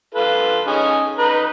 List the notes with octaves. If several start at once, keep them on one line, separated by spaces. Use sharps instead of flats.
F4 A4 B4
C#4 D#4 G#4
D#4 B4 A#5